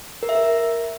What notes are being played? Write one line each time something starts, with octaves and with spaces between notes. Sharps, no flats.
A#4
E5
A#4